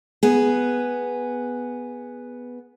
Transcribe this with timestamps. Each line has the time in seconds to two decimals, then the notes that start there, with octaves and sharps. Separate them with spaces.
0.23 B3 G#4